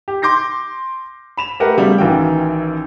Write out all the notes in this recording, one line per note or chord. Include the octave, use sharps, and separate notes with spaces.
G4
C6 D6 G6 A#6 C7
B5 E7 F7
A3 G4 A#4 B4 F#5
C#3 F#3 G3 A3 B3
A1 D#3 E3 F#4 F5 G5